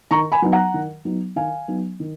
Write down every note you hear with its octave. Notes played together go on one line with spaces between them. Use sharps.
D#3 A#5 C#6
G#5 B5
F#3 B3 D#4
F#5 A#5
D#3
F#3 B3 D#4
D#3 F5 G#5
F#3 B3 D#4
D#3